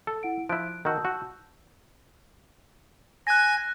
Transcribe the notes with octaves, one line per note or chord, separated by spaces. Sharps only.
A4
E4 F#5 D7
F3 E4 F#6 D7
D#3 F#4 A5 E6 G6
F#4
G#5 F#6 A#6